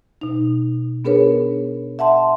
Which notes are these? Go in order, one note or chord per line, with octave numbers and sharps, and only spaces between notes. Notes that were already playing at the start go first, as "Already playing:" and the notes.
B2 D#4
B3 D4 G#4 A#4 B4 C#5
E5 F#5 A5 C6